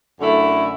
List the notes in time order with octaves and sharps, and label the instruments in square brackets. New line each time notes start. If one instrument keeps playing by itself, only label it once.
[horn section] F#2 D3 A3 E4